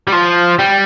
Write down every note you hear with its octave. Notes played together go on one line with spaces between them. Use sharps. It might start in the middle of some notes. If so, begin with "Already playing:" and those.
G3
F3
G3